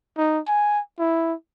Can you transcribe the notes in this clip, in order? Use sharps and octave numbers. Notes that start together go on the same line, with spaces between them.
D#4
G#5
E4